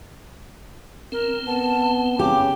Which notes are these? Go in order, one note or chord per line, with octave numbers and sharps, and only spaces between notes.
C4 A#4
B3 A5
C#3 G4 D6